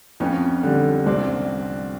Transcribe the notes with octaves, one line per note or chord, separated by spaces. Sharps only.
F2 B3 C#4
D3 G3
C2 C4 D4